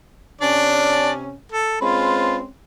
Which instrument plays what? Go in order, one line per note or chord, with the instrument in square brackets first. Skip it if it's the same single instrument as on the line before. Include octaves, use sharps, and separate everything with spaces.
[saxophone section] C3 C#4 [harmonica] D4 D5
[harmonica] A4
[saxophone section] G#3 C4 C#4 [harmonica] F4 B4